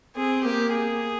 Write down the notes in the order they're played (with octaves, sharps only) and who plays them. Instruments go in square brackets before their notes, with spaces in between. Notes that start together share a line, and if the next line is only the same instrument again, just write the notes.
[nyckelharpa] C4 [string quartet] G#4
[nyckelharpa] A#3 [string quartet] G4
[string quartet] G#4